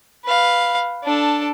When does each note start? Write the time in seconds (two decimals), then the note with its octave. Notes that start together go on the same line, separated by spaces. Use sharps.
0.25 B4 F5
1.04 D4 A4